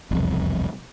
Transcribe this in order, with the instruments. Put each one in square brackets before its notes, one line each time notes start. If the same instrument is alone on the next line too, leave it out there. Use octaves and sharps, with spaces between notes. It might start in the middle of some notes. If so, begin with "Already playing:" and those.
[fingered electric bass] E1 C2 F2